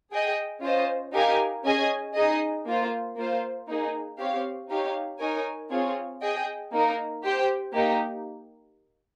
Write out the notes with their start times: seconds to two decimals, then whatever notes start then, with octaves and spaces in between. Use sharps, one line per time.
0.11 G#4 D#5 G5
0.63 C#4 F4 C5 D#5
1.13 D#4 G4 A#4 F5 G#5
1.64 C#4 G#4 D#5 G#5
2.15 D#4 G#4 D#5
2.66 A#3 F4 C5
3.17 A#3 F4 C5
3.67 A#3 D#4 G#4
4.18 C4 G4 C#5 F5
4.69 D#4 G4 C#5 F5
5.20 D#4 A#4 C#5 G#5
5.70 C4 F4 G#4 C#5
6.21 G#4 D#5 G5
6.72 A#3 D#4 A#4
7.23 G4 C5 G5
7.74 A#3 D#4 G4